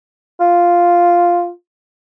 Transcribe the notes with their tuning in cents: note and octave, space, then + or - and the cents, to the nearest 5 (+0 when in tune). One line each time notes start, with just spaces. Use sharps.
F4 +0